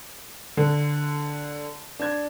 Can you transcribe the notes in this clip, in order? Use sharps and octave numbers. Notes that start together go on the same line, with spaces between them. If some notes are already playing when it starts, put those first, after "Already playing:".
D3
D4 G#6